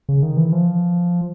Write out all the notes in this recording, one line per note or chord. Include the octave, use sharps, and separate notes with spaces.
C#3
D#3
E3
F3